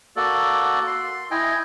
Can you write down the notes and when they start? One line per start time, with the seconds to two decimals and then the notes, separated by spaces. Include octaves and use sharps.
0.16 A#3 F#4 A4 D5
0.87 C6
1.31 E4 D#5 G5 G#5